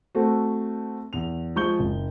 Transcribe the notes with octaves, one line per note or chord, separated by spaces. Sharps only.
A3 C4 F#4 A4 C5
E2 F7
F3 G#3 C#6 G6 G7
F#1